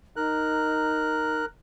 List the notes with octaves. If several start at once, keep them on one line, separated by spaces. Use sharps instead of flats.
D#4 A#4 F#6